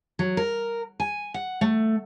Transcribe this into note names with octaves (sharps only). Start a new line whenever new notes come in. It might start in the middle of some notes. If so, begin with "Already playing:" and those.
F#3
A#4
G#5
F#5
A3